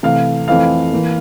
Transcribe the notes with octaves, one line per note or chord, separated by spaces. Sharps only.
C3 E3 A3 F5
F2 E3 A3 C4 F5
E3 A#3